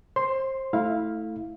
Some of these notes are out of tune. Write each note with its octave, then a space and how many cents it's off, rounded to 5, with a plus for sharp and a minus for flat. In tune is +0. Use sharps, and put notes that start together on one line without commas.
C5 +25 C6 +0
A3 +0 E4 -20 F5 +0